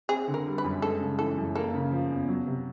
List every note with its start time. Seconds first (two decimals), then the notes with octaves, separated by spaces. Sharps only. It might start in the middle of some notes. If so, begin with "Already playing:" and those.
0.09 C4 G#4
0.28 D3
0.34 A#4
0.46 G3
0.58 B4
0.64 F#2
0.82 G#3 A4
1.01 C#3
1.19 E3 A4
1.37 F#2
1.55 A#3 A4
1.74 C#3
1.92 F3
2.10 E2
2.28 F#3
2.47 C3